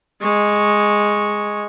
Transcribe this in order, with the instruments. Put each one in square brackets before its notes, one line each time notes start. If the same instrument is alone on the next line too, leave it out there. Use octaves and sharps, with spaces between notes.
[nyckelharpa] G#3 C#6